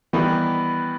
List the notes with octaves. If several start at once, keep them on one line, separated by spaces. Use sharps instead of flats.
D#3 E3 G3 B3